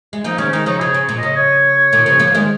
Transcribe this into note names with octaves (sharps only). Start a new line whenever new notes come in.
G#3
F3 A#3 D#4
D#3 G#3 C#4
D#3 G#3 D#4
C#3 F3 D#4
C#3 G#4
C#3
A#2
C#3 D#5
C#5
A#2 D#3
C#3 F3
F3 A#3
D#3 G#3